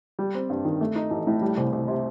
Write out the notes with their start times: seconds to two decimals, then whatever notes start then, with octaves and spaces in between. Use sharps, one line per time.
0.19 G3
0.35 C4
0.50 G2
0.65 D#3
0.81 A3
0.96 D#4
1.10 A1
1.27 A2
1.42 G3
1.57 C2
1.73 C2
1.88 C3